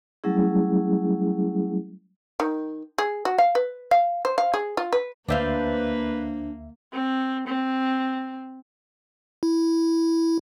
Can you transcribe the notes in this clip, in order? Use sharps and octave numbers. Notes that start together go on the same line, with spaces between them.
F#3 G3 A3 C#4 E4 G#4
D#3
G#4
F#4
F5
B4
F5
C5
F5
G#4
F4
B4
D2 A#3 D4 B4 C5 E5 F5
C4
C4
E4